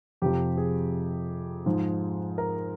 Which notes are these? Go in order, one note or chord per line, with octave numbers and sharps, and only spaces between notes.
F2 C3 F3 G4
G#4
G#2 F3
A#4